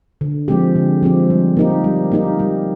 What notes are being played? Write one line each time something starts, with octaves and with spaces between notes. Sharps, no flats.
D3
F3 G#3 C4 G4
D3
F3 G#3 C4 G4
G3
A#3 D#4 G4
G3
A#3 D#4 G4
G3